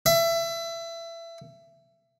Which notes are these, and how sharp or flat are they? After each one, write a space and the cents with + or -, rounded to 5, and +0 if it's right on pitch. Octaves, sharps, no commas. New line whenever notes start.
E5 +25